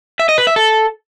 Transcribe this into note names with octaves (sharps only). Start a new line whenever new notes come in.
E5
D#5
B4
E5
A4